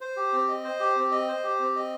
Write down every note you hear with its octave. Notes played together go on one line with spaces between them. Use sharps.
C5
G4
C4
D#5
C5
G4
C4
D#5
C5
G4
C4
D#5